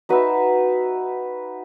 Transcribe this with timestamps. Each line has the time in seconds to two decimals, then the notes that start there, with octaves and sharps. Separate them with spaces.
0.09 D#4 F#4 B4 E5